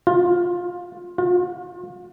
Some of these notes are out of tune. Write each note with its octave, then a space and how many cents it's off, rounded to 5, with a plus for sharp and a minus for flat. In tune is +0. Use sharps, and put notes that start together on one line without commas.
F4 +15
F4 +40